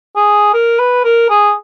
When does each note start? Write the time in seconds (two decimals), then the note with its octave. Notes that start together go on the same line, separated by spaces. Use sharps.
0.16 G#4
0.54 A#4
0.79 B4
1.05 A#4
1.30 G#4